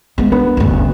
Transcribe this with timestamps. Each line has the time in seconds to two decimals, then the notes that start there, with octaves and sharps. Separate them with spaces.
0.18 G#3 B3
0.32 B3 D4
0.57 F#1 D2